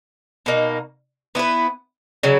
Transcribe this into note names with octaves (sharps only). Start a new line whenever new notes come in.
B2 A#3 D#4
B3 E4 B4
C#3 F#3